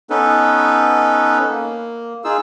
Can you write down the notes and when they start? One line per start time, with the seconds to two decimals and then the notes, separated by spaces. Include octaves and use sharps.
0.10 B3 C#4 D#4 A4 B4
1.49 A#3
2.24 D#4 F4 G#4 E6